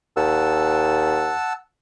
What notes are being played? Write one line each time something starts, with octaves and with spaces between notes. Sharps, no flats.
D#2 F#5 A5 E6